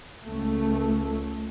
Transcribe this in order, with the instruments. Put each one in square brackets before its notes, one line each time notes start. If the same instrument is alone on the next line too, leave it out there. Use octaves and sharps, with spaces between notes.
[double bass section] C#2 A3